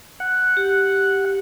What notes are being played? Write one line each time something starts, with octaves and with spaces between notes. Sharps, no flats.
F#5
G4